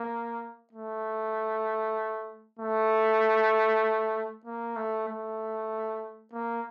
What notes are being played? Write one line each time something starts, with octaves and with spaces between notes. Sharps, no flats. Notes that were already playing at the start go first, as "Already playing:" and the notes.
Already playing: A#3
A3
A3
A#3
A3
A3
A#3